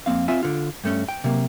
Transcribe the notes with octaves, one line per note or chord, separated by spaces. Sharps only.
F2 A#3 C4 F5
C4 F4 E5 G#5
D3 F4
G2 A3 C#4
G5
C3 F#3 A#3